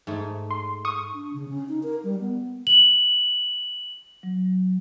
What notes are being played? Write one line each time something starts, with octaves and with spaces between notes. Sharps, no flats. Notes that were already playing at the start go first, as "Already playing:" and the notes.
G#2 A3
C6
C#6 D#6
D4
C#3
C#4
D#4
A#4
G3
B3
F#7
F#3